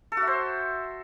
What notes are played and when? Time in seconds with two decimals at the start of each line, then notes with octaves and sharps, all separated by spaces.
0.12 A4
0.17 F#4
0.22 E5
0.27 C5